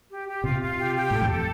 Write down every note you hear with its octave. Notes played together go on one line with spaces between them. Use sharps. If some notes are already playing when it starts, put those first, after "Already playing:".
G4
G4
C3 F4
F4
G4
G4
A2 A4
F2
A4